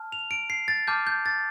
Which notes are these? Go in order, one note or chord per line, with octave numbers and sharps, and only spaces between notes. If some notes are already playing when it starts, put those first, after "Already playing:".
Already playing: A5 F6
F7
D7
C7
A6
A5 D6 F6 G6
G6
A6